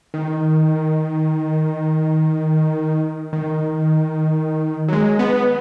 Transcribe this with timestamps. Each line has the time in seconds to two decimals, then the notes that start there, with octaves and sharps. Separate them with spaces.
0.14 D#3
3.33 D#3
4.88 F#3
4.93 G#3
5.19 B3